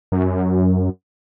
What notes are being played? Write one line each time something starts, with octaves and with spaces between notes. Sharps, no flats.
F#2